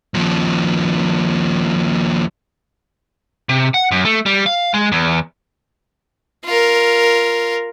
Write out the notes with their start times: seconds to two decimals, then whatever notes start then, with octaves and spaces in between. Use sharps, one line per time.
0.14 D#2 F3
3.49 C3
3.74 F#5
3.91 F#2
4.05 A3
4.26 G3
4.46 F5
4.74 G#3
4.92 E2
6.45 F4 A#4